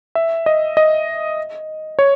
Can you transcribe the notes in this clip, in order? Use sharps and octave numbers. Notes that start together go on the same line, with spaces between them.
E5
D#5
D#5
C#5